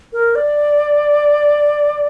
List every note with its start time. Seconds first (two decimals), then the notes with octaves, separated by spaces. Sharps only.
0.13 A#4
0.35 D5